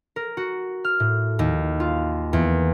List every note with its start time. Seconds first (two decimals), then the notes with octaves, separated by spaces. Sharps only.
0.16 A#4
0.37 F#4
0.84 F6
1.00 A2
1.39 D#2
1.80 F4
2.33 E2